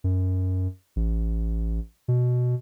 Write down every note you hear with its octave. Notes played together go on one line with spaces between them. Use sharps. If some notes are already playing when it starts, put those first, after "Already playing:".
F#2
A1
B2